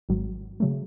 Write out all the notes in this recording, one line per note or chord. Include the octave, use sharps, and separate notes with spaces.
G#1 G#2 F#3
C#3 F#3 A3